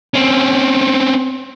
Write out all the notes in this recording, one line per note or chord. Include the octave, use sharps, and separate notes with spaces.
C4 C#4